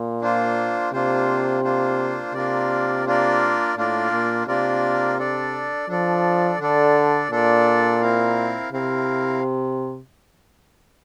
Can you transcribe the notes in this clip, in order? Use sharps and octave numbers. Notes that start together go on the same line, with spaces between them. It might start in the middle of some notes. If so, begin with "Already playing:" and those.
Already playing: A#2
A#3 D4 F4 C5
C3 A#3 D4 F4 C5
A#3 D4 F4 C5
C3 A#3 D4 F4 A#4 D5
A#3 D4 F4 A#4 D5
A2 A#3 D4 F4 A#4 D5
A#2
C3 A#3 D4 F4 A#4 D5
D4 A4 D5
F3 D4 A4 D5
D3 D4 A4 D5
A#2 D4 A4 D5
C4 E4 A#4 F5
C3 C4 E4 A#4 F5